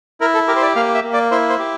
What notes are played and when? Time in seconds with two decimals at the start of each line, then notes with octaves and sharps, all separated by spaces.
0.21 E4 A#4
0.35 A4
0.48 G4 A#4
0.56 C5
0.62 D5
0.76 A#3 F5
0.95 E5
1.04 A#3
1.13 D5
1.31 E4 C5
1.49 C5
1.59 G4